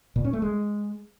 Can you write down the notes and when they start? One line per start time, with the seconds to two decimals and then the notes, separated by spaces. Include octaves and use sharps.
0.16 A#2
0.24 C#4
0.33 A3
0.42 G#3